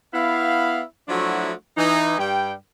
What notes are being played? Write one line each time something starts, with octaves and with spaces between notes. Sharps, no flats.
B3 E4 F5
F3 F#3 A3 D4 E4 F#4
E3 D#4
G2 G3 G5